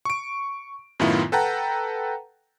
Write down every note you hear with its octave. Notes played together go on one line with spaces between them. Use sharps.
C#6 D7
F#2 A2 D#3 B3 E4 F4
A4 B4 F#5 G5 A5 A#5